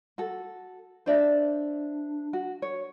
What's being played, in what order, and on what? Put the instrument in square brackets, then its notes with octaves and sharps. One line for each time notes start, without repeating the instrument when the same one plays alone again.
[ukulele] F#4 A4
[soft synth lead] D4 [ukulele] C5 D5 E5
[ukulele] F#4
C#5